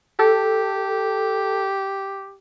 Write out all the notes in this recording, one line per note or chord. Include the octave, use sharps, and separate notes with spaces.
G4 A4